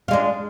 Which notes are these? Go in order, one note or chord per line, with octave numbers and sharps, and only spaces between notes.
G#3 D4 F4